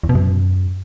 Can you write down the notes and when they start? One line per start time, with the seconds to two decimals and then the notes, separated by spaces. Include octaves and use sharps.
0.03 E2
0.09 B2
0.15 F#2